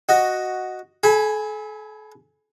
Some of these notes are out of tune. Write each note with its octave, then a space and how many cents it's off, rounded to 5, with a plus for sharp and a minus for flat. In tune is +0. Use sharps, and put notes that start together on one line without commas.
F#4 +0 D#5 +0
A4 -40 G#5 +0 B5 +0